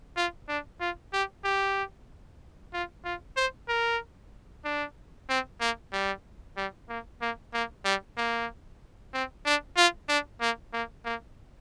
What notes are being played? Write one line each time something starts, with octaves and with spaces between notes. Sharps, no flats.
F4
D4
F4
G4
G4
F4
F4
C5
A#4
D4
C4
A#3
G3
G3
A#3
A#3
A#3
G3
A#3
C4
D4
F4
D4
A#3
A#3
A#3